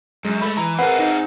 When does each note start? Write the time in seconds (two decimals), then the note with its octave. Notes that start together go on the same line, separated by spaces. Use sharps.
0.25 F#2 G#3
0.42 A3 B5
0.57 E3 A#5
0.79 C4 G#4 A#4 B4 F#5
0.99 D#4